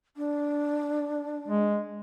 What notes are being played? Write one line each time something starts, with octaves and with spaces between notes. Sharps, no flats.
D4
G#3